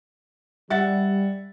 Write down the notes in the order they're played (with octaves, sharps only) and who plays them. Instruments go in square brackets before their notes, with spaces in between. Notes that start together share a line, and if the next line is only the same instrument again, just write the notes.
[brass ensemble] G3 [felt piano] E5 F#5 A6